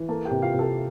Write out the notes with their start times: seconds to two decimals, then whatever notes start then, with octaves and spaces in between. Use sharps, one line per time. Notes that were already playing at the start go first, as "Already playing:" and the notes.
Already playing: E3
0.08 A#3 A4 A5
0.25 G4 G5
0.31 C3
0.42 F4 F5
0.54 C3
0.59 A4 A5